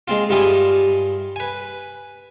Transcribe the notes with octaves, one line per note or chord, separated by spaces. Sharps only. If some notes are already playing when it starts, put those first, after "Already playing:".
G#3 C4 F4
G2 E4 F4 G4 G#5 D#6
B4 G#5